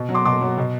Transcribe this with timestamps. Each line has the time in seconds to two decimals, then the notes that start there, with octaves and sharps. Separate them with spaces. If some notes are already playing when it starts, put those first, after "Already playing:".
Already playing: B2
0.09 F#3
0.14 C6 D6
0.25 B2 C6 D6
0.41 F#3
0.58 B2